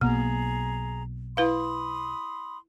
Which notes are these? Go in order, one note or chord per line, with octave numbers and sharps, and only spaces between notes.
B1 B2 A#3 G#4 A#5
E4 B4 F5 B5 C6 D#6